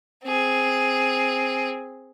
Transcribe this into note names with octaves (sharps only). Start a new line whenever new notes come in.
C4 G#4